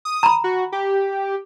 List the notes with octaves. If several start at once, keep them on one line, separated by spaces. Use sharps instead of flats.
D#6
A#5 B5
F#4
G4